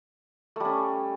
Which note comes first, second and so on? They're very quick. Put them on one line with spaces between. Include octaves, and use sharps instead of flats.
A3 G3 C#4